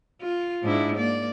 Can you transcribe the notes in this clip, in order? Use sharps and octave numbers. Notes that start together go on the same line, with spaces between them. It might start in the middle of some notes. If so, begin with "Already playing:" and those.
F4
G#2 D4 E4
A#3 D5